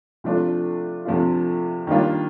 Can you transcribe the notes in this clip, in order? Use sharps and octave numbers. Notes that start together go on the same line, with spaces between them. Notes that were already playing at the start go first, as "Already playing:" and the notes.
C3 F3 A3 D4 F4
C3 F3 A3 D4 F4
D#3 G3 A#3 D4 F4